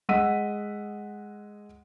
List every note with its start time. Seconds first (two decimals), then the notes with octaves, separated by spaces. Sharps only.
0.09 G#3 D#5 F#5 E6 B6 D#7